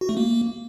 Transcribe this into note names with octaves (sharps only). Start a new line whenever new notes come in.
F#4
A3
A#3